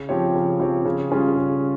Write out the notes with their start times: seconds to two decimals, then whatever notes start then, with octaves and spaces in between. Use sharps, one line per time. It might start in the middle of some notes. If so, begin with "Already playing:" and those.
Already playing: C#3
0.09 F3 C4 G4 C#5
0.35 C#3
0.60 F3 C4 G4 C#5
0.85 C#3
1.11 G3 C#4 F4 G#4
1.36 C#3